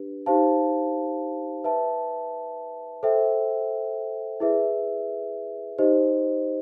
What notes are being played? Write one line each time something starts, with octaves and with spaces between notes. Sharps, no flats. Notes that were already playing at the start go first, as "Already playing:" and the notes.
Already playing: D4 G4 B4
D#4 G4 C5 F5 A5
B4 E5 A5
A4 C5 E5 G5
E4 G#4 B4 E5
D#4 G4 C5 D#5